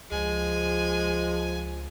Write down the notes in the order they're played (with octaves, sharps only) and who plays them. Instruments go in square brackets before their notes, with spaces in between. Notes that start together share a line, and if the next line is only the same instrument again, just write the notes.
[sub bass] C#2 [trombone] F3 [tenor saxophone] G#3 [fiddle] G#5